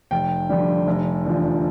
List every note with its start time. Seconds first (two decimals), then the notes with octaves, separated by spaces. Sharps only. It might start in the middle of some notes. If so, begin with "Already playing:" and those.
0.11 F1 G5
0.49 F2 D3 G3
0.87 F1
1.25 E2 D3 F3